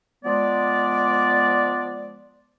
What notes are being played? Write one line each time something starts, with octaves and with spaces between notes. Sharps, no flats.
F3 G#3 B3 D5